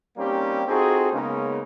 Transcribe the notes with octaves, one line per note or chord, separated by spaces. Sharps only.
G3 A#3 C4 C#4 D#4 G4
C4 D#4 F4 F#4 G#4 A4
C#3 G#3 A#3 B3 C#4 D#4